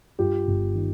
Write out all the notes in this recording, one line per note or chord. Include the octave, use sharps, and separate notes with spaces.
G2 F4 G4
G1
D#3